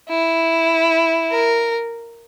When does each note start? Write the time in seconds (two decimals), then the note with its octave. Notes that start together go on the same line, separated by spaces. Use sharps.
0.09 E4
1.31 A#4